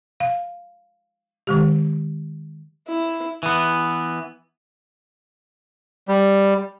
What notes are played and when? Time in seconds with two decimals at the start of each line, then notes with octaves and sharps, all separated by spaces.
0.20 F5
1.47 D#3 G#3 G4
2.88 E4
3.43 E3 B3
6.08 G3